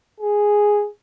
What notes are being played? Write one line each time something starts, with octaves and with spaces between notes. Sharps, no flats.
G#4